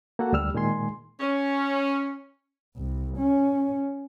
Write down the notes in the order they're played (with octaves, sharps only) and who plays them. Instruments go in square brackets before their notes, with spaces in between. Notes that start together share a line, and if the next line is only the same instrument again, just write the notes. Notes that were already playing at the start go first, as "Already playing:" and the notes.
[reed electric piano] A#3 F#4 A4 F#5
D2 G3 E6 F6
A#2 D#3 G#3 G#5 C6
[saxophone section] C#4
[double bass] C2
C#4